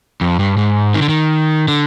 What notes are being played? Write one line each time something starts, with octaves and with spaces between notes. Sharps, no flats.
F2
G2
G#2
D#3
D3
D#3
D3